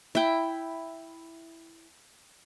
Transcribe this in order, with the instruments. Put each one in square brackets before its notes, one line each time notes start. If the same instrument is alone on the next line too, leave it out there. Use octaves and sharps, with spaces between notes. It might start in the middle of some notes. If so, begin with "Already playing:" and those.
[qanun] E4 G5